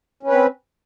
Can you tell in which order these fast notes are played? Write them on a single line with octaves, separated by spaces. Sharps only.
C#4 B4 C4